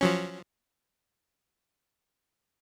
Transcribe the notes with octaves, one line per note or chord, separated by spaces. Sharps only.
F3 F#3 C#4